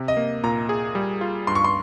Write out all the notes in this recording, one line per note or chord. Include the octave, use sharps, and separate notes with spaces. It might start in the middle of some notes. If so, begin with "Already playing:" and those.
Already playing: C3
D#5
A#3
A#2 A#5
G#4
G3
F4
G2 C6
C#6
C6